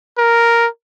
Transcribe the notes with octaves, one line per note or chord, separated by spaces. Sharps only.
A#4